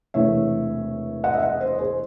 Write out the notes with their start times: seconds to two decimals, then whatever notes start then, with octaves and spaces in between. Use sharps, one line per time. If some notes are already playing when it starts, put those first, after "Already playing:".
0.14 E1 E2 C3 E3 A3 C#5 E5
1.24 D#5 F#5
1.34 E5
1.42 D#5 F#5
1.60 C5 D#5
1.78 G#4 C5